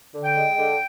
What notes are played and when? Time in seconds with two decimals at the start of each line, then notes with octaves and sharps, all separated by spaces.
0.13 D3
0.24 G5
0.35 G#3
0.56 D3